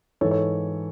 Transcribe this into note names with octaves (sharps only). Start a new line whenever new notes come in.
G#2 E3 A4 C#5
A4 C#5